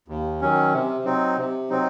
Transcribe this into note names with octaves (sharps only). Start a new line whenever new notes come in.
D#2
D#3 F#3 C#4
C3
F#3 C4 D#4
C3
F#3 C4 D#4